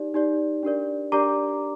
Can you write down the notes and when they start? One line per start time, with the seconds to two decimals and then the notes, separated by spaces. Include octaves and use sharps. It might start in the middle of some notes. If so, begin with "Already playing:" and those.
Already playing: D#4 G4 D5
0.14 D#4 G4 D5
0.63 D4 G4 A#4 D5
1.12 D4 G4 A#4 D5 A#5 D6